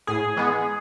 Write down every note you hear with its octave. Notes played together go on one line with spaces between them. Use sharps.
A2 G#4
E3 G#3 B3